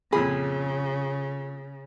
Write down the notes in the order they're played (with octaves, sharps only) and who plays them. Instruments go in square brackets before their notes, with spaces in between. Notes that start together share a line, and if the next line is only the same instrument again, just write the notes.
[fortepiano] F2 A#2 B5 [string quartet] C#3 [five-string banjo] G#4